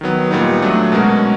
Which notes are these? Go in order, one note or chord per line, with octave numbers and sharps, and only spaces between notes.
D#3 F#3 B3
A#2 G3 B3 D#4
A#2 F#3 A3 D4
B2 G#3 C#4 F#4 A#4